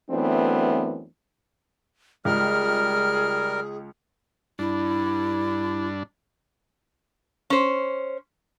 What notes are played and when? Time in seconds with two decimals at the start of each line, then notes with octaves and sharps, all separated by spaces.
0.10 F#2 E3 A3 B3 C4 D4
2.25 C#2 G3 G#4 A#4 F6
4.59 G2 D4 E4
7.50 C#4 C5